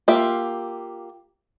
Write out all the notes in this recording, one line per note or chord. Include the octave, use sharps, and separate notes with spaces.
A#3 F4 G4 E5